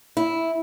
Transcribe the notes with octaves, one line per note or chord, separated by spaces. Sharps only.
E4